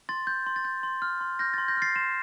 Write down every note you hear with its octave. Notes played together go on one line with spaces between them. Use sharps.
C6 A6
G6
C6
A6
G6
C6
F6
C6
F6 G6 A#6
C6 A6
G6 A#6
F6 A6 C7
C6 C7 E7